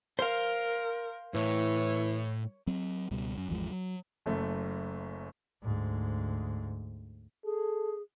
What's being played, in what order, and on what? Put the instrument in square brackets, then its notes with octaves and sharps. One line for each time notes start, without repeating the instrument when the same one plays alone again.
[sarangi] A#4 [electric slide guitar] C5 F5
[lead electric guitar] A2 [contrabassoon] E3 [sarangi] C#5
[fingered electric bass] F#3 C4
C#2 B2 G3
F#2
G#1 E2 F3 G#3
F#3
[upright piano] F#1 F#2 A3
[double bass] D2 G#2
[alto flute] G#4 [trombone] A4